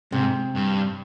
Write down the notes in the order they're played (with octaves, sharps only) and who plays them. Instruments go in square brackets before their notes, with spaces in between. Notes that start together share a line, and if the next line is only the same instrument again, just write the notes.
[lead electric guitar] G#2 [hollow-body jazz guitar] C3
[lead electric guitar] G2